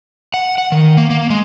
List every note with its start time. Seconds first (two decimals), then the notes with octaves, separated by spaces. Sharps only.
0.34 F#5
0.58 F#5
0.72 D#3
0.97 A#3
1.10 A#3
1.30 G#3